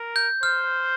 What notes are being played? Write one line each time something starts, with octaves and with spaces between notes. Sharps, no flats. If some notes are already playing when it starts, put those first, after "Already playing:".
Already playing: A#4
G6
C5 F6